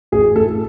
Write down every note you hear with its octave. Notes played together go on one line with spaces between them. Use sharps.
A1 G#4
A2 A4